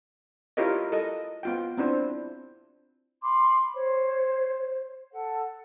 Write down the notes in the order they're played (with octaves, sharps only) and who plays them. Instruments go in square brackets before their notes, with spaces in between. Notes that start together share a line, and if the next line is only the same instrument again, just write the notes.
[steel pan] E4 F4 G4 A#4 C#5 D#5
A4 D#5
B3 F4 G5
C4 D4 E4 C5
[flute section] B5 C6 D6
C5 C#5
A4 F#5